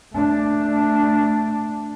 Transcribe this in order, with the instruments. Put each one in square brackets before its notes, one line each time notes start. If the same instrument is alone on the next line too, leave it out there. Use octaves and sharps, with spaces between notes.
[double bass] A3 D4